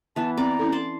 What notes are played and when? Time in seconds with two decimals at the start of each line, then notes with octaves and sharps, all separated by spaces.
0.16 E3 B3 A5
0.37 C4 D5 A#5
0.59 C#4 E4 A4
0.72 D5 A5 C6